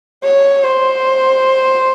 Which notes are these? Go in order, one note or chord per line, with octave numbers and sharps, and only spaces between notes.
C#5
C5